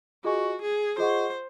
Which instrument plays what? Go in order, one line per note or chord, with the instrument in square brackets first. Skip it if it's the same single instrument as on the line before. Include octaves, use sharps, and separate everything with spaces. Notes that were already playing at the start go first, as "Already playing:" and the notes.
[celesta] F4 G#4 D#5 G#5 C#6 [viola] F#4
[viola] G#4
[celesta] F4 G#4 D#5 F#5 C#6 [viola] C5